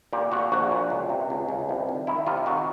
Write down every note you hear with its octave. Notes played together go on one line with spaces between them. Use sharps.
A#2 G4
A#2 F#4
A#1 F#4
A#2
C#2
C3
C#2
C#2
C2
D#3
D#3 E4
C3 F4
D#3 F#4